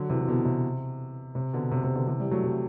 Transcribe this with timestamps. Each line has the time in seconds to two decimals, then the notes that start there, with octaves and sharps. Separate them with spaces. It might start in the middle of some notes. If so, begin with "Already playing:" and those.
Already playing: D3 F#3
0.09 C3 E3
0.20 E3
0.27 B2 D3
0.45 C3
1.35 C3
1.53 B2 D3
1.71 C3
1.84 C3
1.95 B2 D3
2.07 C3 E3
2.19 E3 G3
2.31 F#3 A3
2.44 C3